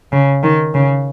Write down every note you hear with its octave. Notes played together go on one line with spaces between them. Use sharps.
C#3
D#3
C#3